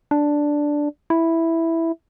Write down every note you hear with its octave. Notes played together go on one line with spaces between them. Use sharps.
D4
E4